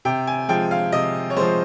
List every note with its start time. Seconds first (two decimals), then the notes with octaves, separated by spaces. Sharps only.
0.05 C3 G5
0.27 G#5
0.49 F3 G#3 G5
0.71 F5
0.92 C3 D#5
1.30 C#5
1.36 F3 G#3 C5